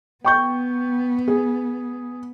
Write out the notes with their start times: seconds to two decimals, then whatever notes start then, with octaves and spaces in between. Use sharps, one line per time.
0.25 B3 G5 C#6 G6
1.28 G#4